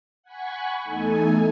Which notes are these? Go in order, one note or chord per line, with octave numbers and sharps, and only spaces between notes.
F#5 G#5 B5 C#6
E2 A3 D#4 A4 G#5